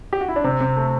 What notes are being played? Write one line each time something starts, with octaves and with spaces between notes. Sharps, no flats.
G4
F#4
E4
D4
C3 C4
C3 C4
A3